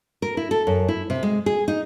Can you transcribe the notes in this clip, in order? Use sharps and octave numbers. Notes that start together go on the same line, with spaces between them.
A#4
E4
A4
F#2
E4
C3
G#3
G#4
D#4